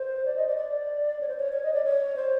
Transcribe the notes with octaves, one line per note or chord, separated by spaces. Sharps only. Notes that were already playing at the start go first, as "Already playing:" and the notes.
Already playing: C5
D5
D#5
D5
D5
C#5
C5
C#5
C#5
D#5
D5
C#5
C5